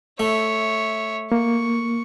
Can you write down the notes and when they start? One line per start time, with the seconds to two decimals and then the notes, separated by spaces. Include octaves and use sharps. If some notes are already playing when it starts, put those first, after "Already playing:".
0.20 A3 C#5 E5
1.32 A#3 C#6